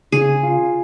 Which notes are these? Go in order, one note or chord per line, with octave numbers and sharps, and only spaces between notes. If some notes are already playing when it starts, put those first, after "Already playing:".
C#3 G#4
F4